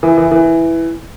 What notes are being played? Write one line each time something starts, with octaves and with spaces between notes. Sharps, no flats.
E3
E3
E3